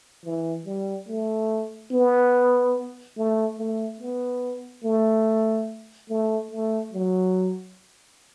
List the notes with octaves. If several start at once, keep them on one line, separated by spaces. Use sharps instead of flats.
E3
G3
A3
B3
A3
A3
B3
A3
A3
A3
F#3